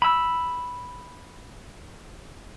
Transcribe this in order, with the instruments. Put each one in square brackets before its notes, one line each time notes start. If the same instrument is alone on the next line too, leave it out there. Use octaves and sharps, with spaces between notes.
[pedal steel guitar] B5 E6